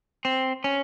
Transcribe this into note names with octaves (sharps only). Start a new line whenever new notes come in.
C4
C#4